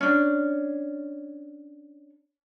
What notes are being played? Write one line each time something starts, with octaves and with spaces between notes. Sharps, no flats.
C#4 D4